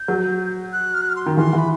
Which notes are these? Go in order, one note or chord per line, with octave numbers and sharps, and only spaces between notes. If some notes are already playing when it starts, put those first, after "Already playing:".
Already playing: G6
F#3
F#6
F6
F#6
F6
C6
D#3
E3 C6
E3
B5